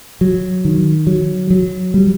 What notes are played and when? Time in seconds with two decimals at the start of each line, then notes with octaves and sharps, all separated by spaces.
0.21 F#3
0.65 D#3
1.07 F#3
1.50 F#3
1.94 G3